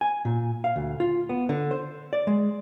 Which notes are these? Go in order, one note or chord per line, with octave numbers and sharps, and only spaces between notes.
G#5
A#2
F5
D2
F4
B3
D3
C5
D5
G#3